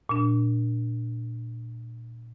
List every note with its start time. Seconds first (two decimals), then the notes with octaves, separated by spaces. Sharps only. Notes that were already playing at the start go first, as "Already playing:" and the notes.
0.09 A#2 D4